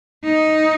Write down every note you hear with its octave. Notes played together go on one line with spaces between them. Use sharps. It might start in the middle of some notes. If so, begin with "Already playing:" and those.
D#4